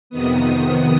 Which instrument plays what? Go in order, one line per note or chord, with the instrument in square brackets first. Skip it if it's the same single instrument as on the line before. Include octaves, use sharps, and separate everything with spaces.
[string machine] F2 C3 D#3 B3 D#6